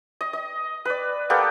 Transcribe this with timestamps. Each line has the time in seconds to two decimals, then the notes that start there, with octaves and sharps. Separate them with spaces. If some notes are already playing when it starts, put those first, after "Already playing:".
0.21 D#5
0.33 D#5
0.85 B4 D5
1.30 A#3 B3 G4 A4